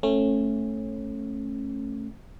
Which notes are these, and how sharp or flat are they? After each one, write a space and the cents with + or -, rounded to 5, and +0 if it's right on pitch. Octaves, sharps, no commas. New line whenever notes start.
A3 +0 C#4 -25